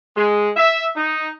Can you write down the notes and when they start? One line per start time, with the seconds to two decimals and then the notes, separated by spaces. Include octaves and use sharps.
0.17 G#3
0.57 E5
0.97 D#4